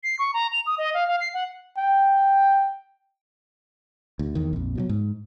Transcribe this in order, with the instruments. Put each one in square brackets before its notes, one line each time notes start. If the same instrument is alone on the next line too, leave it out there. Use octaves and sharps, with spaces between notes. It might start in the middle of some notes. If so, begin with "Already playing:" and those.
[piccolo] C7
C#6
A#5
F7
D#6
D#5
F5
F5
C7
F#5
[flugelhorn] G5
[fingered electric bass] D2
E2 D#3
A#1 F2
B2 E3 F#3
G#2